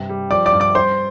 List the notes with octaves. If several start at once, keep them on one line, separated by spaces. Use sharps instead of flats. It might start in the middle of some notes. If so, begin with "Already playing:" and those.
Already playing: G2 C3
G3
F3 D5 D6
D5 D6
G2
D5 D6
G2 C5 C6